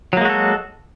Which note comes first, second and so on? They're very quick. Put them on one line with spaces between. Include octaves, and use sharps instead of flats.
F#3 A#3 G#3 F#4 A4